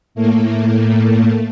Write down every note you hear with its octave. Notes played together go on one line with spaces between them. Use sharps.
A2 A3 A#3